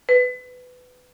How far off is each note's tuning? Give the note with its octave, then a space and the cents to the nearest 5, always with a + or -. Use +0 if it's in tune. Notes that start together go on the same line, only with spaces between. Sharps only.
B4 +20